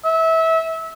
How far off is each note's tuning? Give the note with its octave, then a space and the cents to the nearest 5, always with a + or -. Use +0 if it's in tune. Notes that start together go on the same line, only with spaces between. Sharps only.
E5 -25